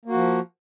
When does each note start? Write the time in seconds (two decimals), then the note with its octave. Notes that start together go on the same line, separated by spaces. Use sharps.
0.05 A#3
0.09 F#4
0.13 F3